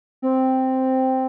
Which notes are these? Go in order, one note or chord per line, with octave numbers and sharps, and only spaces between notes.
C4